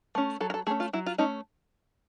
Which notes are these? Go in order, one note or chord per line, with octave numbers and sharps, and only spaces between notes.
A3 C#4
F#3 A4
A#4
A4
A3 C#4 G#4
F4
F#3 E4
F4
A3 C#4 D#4